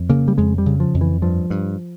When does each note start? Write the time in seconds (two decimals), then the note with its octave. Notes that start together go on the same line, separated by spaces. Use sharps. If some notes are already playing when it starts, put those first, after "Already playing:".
Already playing: F2
0.09 C#3 A#3
0.28 G3
0.38 F2 G#3
0.58 G3
0.66 C#3
0.80 F3
0.94 F2
1.01 E3
1.22 G2 F3
1.50 G2